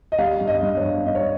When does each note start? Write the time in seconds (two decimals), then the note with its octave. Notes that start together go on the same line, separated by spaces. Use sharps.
0.12 D#5
0.18 G3 F5
0.40 G2
0.48 D#5
0.62 G2
0.77 C#5
0.84 G2
1.06 G2 D#5
1.15 C#5